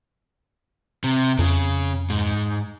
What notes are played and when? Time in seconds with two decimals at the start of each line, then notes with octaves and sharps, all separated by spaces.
1.04 C3
1.39 F2 C#3
2.10 G#2